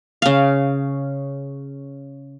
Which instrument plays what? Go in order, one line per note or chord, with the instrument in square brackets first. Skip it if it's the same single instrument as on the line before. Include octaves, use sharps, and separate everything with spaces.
[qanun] C#3 F5